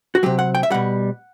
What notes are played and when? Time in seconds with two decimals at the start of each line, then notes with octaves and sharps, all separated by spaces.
0.15 F#4
0.23 C3 F#3 G4
0.39 F#5
0.55 G5
0.63 E5
0.70 B2 G3 F#5